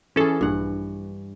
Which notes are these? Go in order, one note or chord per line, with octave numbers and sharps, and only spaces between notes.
E3 C#4 G#4 A4
A#1 G2 F#5